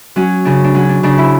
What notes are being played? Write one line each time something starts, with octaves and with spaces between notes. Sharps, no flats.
F#3 C#4
C#3 D4
D4
F#3 C#4
D4
C#3 D4
E4